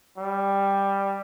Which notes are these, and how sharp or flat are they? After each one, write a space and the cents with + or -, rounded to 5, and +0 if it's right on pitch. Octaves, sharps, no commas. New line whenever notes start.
G3 +10